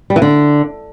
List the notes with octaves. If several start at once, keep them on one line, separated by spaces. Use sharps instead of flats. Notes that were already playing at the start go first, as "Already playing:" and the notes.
G3
E3
D3